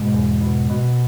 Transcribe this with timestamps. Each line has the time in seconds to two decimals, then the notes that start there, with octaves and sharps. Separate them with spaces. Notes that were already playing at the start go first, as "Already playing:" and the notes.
Already playing: G#2 B2 G#3
0.14 E2
0.41 B2
0.70 B2